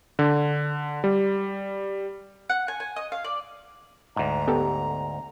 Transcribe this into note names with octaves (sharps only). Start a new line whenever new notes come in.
D3
G3
F#5
G#5
G#5
D#5
F5
D5
D2 G#2 A#5
B3 G4 A4